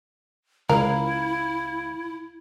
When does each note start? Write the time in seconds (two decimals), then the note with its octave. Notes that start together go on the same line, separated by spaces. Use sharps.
0.69 C#2 E4 A#4 F5